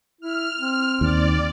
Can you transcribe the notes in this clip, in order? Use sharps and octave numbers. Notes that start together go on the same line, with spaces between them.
E4 F6
C4
D#2 D5